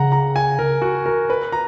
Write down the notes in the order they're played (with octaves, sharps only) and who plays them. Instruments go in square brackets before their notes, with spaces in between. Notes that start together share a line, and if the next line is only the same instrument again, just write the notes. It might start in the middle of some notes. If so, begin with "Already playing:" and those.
Already playing: [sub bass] C#3 [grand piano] F#5 A#5
[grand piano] A#5
G#5
A#4
F#4
A#4
B4
A#5